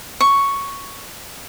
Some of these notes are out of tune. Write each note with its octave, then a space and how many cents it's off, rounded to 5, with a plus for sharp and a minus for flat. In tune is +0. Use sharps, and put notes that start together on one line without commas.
C#6 +0